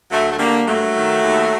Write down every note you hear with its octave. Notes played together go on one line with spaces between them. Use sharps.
D2 F#3 A3
A3
D3 G3 A#3
G2 F#3 A3
D#3
D#2